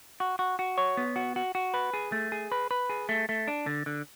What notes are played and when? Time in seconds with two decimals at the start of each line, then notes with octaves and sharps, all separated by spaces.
0.20 F#4
0.39 F#4
0.59 F#4
0.78 C#5
0.97 B3
1.16 F#4
1.36 F#4
1.55 F#4
1.74 B4
1.94 G#4
2.12 A3
2.32 G#4
2.52 B4
2.71 B4
2.90 G#4
3.09 A3
3.29 A3
3.48 D4
3.66 D3
3.86 D3